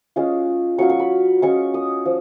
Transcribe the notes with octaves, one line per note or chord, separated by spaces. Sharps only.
G#3 C#4 F4
F#3 C#4 F4 C#6
C#6
B5
G#3 C#4 F4 C#6
D#6
F3